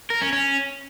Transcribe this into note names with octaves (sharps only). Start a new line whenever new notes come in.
A#4
C#4
C#4